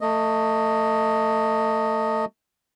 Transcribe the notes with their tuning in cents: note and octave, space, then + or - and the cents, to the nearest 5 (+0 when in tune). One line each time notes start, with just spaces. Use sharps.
A3 +25 D#5 +0